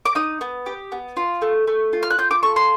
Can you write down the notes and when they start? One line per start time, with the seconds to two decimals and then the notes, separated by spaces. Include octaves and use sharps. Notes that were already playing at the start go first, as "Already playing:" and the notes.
0.05 D6
0.15 D#4 D#6
0.41 B3
0.66 G4
0.92 B3
1.17 F4
1.42 A3
1.67 A3
1.93 F4
2.03 F6
2.10 F#6
2.18 F4 G6
2.31 D6
2.43 A4 C#6
2.56 C6